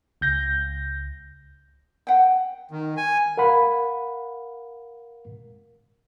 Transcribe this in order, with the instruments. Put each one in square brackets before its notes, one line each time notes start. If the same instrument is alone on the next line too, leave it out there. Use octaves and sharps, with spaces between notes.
[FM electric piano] C#2 G6 A#6
[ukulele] F#5 G5
[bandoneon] D#3
G#5
[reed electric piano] A#4 F5 F#5 B5